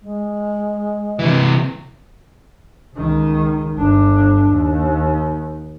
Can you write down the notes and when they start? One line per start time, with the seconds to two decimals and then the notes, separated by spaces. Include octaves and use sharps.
0.03 G#3
1.19 C3 E3
2.95 C#2 D#3
3.75 G1 D4
4.50 D#2